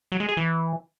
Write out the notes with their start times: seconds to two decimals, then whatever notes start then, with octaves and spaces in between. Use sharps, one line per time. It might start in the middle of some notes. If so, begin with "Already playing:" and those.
0.12 F#3
0.20 G#3
0.29 G#4
0.37 E3